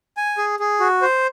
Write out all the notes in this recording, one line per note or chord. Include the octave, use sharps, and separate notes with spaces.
G#5
G#4
G#4
F#4
C5